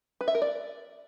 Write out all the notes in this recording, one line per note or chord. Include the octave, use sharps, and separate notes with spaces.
B4
E5
A#4
D5